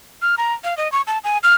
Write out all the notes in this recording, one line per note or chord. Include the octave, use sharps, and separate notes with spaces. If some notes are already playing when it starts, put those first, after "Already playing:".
F6
A#5
F5
D#5
C#6
A5
G#5
F6